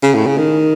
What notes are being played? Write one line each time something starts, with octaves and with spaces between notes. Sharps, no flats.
C#3
A2
C#3
D#3